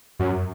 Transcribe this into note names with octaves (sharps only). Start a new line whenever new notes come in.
F#2